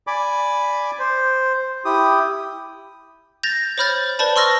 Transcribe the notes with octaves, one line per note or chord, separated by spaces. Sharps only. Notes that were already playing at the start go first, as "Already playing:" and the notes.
D5 G#5 B5 D6
C5
E4 G4 D#6
G6 A6 A#6 F7
C5 C#5 B5 F6 G6 A6
B4 C5 D5 A5 B5
C6 C#6 E6 F6 A#6